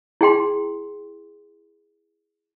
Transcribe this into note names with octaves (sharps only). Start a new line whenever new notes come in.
E4 G#4 G5 C6